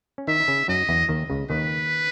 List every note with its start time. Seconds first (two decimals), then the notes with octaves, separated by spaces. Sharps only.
0.18 C#4
0.28 D#3 D#4 E5
0.40 D#4
0.48 C#3 C#4
0.68 F#2 F#3 D#5
0.89 E2 E3
1.09 D#2 D#3
1.30 C#2 C#3
1.50 D#2 D#3 B4